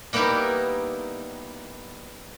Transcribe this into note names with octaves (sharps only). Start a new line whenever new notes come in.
G3 A#3 B3 D#4 E4 G4